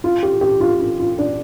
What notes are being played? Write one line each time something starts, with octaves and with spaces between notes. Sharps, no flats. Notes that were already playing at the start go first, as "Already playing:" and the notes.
F4
G4
G4
F4
F4
F4
D4